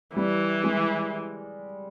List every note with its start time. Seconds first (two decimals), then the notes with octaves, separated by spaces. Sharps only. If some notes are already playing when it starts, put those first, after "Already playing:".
0.15 E3 G3
0.64 G#3